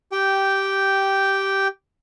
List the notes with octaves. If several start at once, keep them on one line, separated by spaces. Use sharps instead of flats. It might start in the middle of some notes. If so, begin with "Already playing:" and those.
G4 G5